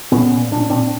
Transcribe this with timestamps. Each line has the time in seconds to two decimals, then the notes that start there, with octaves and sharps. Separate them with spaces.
0.12 A#2 B3 C#4
0.32 A#2
0.51 A#2 D4
0.61 C#4
0.70 A#2 C4 D4